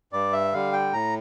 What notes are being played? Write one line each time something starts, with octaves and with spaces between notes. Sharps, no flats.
G2 D5
E5
D3 G3 F5
G5
A2 A#5